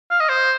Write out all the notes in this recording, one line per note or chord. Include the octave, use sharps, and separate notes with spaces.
F5
D#5
C5